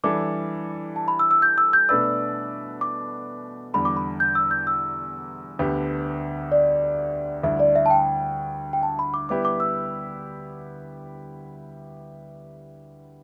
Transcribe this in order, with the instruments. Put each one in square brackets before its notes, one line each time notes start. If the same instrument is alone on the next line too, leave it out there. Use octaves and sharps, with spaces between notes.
[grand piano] E3 G3 D4 A4 [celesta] D6
[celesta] A5
B5
E6
E6
G6
E6
G6
[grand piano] B2 A3 D4 B4 D5 [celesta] E6
[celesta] D6
[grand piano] E2 D3 G3 [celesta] B5
[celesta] D6
B5
G6
E6
G6
E6
[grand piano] D2 D3 B3 G4 B4
[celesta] D5
[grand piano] D2 D3 G3 E4 [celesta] E5
[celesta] D5
E5
A5
G5
G5
A5
B5
D6
[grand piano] G3 B3 E4 G4 B4 [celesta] D6
[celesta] D6
E6